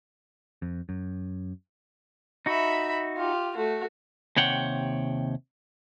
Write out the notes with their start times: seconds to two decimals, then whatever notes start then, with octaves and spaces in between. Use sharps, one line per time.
0.62 F2
0.89 F#2
2.46 D#4 F#4 E5 B5
3.16 F4 G4
3.55 A3 F#4
4.37 D#2 C3 C#5 F#5 G5